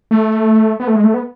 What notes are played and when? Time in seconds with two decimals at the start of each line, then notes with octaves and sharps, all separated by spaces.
0.11 A3
0.80 B3
0.87 A3
0.96 G#3
1.04 A3
1.14 B3